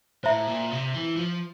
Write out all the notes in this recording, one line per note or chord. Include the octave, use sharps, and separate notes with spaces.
A2 C5 E5 A#5
A#2
C3
E3
F3